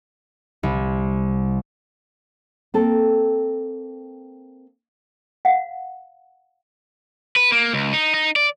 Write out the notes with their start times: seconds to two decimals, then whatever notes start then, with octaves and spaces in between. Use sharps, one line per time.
0.63 C2
2.74 A#3 C4 A4
5.45 F5 F#5
7.36 B4
7.52 A#3
7.74 C#2
7.93 D#4
8.14 D#4
8.36 D5